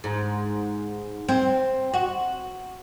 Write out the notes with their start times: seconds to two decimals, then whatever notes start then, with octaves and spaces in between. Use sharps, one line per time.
0.04 G#2
1.29 C4
1.94 F#4